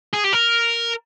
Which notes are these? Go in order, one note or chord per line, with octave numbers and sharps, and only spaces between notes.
G#4
G4
A#4